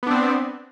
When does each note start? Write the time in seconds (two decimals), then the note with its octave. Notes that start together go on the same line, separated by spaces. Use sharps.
0.03 B3
0.07 D4
0.11 C4